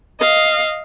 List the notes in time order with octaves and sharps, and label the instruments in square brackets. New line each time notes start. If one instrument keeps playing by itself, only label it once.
[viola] D#5 F5